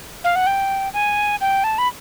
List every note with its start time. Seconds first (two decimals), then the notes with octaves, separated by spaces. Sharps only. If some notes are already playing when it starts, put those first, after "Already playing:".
0.24 F5
0.35 F#5
0.47 G5
0.94 G#5
1.41 G5
1.64 A5
1.78 B5